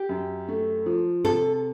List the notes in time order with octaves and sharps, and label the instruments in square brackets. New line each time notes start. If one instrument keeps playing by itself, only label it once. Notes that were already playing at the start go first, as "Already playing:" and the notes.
Already playing: [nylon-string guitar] G4
[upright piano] F#2
A3
F3
[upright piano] C3 [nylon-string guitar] A4